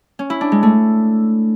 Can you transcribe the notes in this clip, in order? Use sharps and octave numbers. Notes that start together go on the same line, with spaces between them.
C#4
E4
D4
G#3
A3